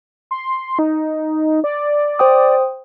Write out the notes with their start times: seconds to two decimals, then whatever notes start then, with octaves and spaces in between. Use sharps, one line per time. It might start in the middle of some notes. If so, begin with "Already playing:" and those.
0.31 C6
0.79 D#4
1.64 D5
2.19 C5 G5 D#6